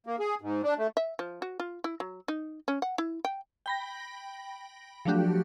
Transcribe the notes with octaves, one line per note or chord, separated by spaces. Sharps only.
A#3
G#4
G#2
D4
A3
E5
F3
F#4
F4
E4
F#3
D#4
C#4
F#5
E4
G5
G5 B5 A#6
F3 F#3 A3 D4 F#4 G4